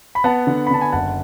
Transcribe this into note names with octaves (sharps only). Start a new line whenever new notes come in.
B5
B3 F#5 A5
D3
B5
D3 A5
G#5 B5
F#1 F#5 A5